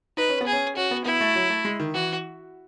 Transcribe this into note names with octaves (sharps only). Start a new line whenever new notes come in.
D#4 B4
C#4
B3
G#4
C#4
C#4 F#4
B3
B3 E4
A3
F#3
A3
G#3
D#3
E3 F#4